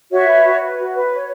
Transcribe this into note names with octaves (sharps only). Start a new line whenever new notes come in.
F#4 C#5 E5
B4
F#4
B4
F#4
B4
C#5